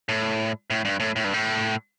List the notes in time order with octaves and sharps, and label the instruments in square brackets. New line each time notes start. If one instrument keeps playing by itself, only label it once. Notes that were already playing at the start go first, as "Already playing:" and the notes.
[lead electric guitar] A2
A2
G2
A2
A2
G2
A2